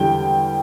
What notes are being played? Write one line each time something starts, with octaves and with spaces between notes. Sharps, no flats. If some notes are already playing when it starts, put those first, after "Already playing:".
Already playing: E2 D3 G3 G5